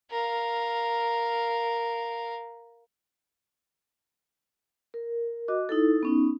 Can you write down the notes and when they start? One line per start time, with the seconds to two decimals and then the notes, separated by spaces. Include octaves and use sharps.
0.11 A#4 F5
4.94 A#4
5.48 F#4 D#5 D6
5.69 D#4 E4 A4
6.03 B3 C#4 D#4